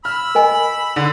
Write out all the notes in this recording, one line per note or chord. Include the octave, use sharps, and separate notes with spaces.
B5 E6 F6
A#4 D#5 G#5
D3